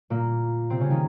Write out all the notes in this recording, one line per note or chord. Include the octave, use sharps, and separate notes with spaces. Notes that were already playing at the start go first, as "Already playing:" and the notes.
A#2 A#3
C3 C4
C#3 C#4
D#3 D#4